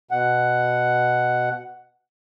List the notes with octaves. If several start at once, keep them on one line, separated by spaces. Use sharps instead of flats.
B2 F#5